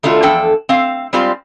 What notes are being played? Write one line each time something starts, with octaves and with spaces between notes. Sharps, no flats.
D#3 A3 D4 F4 F#4
E2 F3 D4 A4 G5
C4 F5
G3 G#3 C4 F4 G4 D5